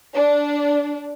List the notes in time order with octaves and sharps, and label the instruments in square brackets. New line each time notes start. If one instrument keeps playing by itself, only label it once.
[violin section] D4